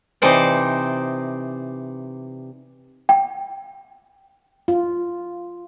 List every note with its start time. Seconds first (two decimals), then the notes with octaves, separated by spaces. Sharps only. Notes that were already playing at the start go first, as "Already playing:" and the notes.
0.22 C3 E3 D#4 C5 D5 A5
3.09 G5
4.68 F4